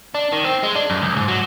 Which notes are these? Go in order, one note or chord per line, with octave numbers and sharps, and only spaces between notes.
D4
D#3
C4
G#3
D4
F#2
C#2
G#2
F#3